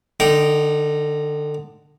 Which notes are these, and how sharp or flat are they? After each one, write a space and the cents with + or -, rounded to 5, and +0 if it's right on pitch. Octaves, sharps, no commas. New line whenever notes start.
D3 +20 D#4 -5 G5 -20